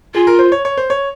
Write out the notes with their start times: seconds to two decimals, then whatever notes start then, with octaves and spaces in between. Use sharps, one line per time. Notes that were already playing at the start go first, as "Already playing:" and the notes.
0.14 F4 G#4
0.27 A#4
0.39 C5
0.52 C#5
0.65 C#5
0.77 C5
0.90 C#5